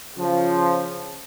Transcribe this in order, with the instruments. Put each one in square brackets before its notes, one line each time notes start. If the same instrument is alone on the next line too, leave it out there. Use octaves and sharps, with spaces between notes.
[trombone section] C#3 F3